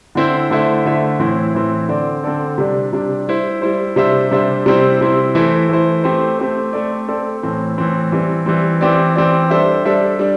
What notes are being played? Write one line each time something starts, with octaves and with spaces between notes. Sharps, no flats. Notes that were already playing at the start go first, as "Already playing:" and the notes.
D3 C4 E4 C5
D3 A3 E4 C5 E5
D3 A3 E4 C5 E5
A2 E3 C4 E4
A2 E3 C4 E4
D3 C4 A4 D5
D3 C4 A4 D5
C3 G3 D4
C3 G3 D4
G3 E4 C5
G3 E4 C5
C3 G3 D4 C5 E5
C3 G3 D4 C5 E5
C3 G3 C4 E4 C5
C3 G3 C4 E4 C5
E3 A3 E4 C5
E3 A3 E4 C5
A3 C4 G4 C5
A3 C4 G4 C5
A3 C4 A4 D5
A3 C4 A4 D5
A2 E3 C4
A2 E3 C4
E3 G3 C4
E3 G3 C4
E3 C4 G4 D5
E3 C4 G4 D5
G3 D4 A4 C5 E5
G3 D4 A4 C5 E5
G3 D4